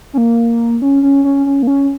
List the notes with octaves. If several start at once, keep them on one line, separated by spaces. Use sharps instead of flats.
C#4
A#3
C#4
C#4
C#4
C#4
A#3
C#4